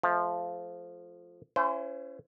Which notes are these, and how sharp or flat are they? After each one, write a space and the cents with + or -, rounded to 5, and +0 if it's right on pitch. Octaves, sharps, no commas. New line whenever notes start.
F3 +0 A3 -25
C#4 +0 E4 +35 C5 -30